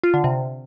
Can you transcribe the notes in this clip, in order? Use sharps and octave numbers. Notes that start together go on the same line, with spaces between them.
F4
D3
C3